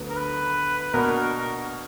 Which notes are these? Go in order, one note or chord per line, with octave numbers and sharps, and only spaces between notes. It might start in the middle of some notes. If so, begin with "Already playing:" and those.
Already playing: D2 D3 F#3 B3
A#4
B4
B2 A#3 D4 F#4 A#4